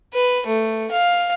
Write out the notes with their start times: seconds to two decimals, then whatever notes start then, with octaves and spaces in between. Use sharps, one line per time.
0.14 B4
0.47 A3
0.92 F5